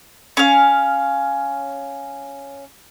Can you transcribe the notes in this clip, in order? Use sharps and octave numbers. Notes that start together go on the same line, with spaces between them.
C#4 F5